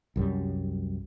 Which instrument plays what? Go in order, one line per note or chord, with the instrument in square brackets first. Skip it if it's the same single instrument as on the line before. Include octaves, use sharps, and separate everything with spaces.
[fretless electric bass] C2 F#2 G3